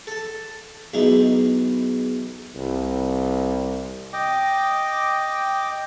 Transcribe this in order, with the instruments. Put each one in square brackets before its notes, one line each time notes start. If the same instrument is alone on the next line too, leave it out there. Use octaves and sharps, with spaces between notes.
[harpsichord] A4 A5
B1 G#3 D#4 E4
[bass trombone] C2
[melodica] D#5 G5 D6